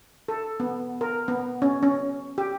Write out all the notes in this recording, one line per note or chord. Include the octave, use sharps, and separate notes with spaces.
A4
B3
A#4
B3
C#4
C#4
G4